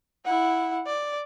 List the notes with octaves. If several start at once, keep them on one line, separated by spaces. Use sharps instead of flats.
E4 F#5
D5